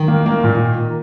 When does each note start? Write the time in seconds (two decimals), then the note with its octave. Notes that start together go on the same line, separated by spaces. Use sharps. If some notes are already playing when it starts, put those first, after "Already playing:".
Already playing: D#3
0.08 A#3
0.26 A#3
0.44 A#2